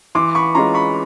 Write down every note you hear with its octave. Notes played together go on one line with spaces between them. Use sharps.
E3 C6 D6
B5 C#6
G#3 C#4 F4 A#5 C6
B5 C#6